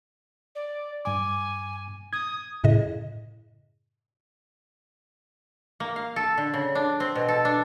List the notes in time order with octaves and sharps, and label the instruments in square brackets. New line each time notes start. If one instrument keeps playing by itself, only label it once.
[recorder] D5
[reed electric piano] G2 D6 [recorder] G#5
[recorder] D#6 [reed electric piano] G#6
[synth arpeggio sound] F#2 A2 C#3 D#5
[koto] A#3
F5
A4
D3
C#3
D4
C4
B2
A4
D4